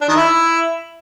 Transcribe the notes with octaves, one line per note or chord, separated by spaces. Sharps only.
D4
D#3
E4